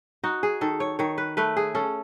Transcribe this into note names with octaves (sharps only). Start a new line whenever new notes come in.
D#4 F#4
G#4
D#3 A4
C#5
D#3 C#5
B4
A3 B4
G#4
C#4 A4